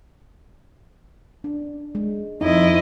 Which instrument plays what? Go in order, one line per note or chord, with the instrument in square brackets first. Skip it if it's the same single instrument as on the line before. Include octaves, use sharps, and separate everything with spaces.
[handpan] D4
G#3
[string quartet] F2 E4 D#5 [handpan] D#4